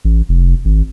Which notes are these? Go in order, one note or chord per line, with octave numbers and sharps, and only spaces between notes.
A1
F1
G#1